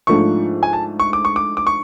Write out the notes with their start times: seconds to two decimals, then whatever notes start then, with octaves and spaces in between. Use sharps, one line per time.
0.07 G#2 F3 A3 D4 C#6
0.63 G#5
0.73 A5
1.00 C#6
1.13 D6
1.25 C#6
1.36 D6
1.57 D6
1.67 C#6